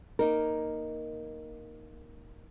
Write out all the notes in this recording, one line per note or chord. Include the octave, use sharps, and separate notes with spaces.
A#3 D#4 A#4